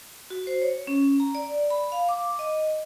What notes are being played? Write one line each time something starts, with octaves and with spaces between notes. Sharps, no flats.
F#4
C5
C#5
C#4
A#5
D5
B5
F5
D6
D#5